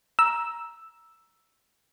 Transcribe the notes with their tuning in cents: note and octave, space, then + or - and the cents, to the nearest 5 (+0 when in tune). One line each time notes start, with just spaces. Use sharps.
A#5 +15 E6 +0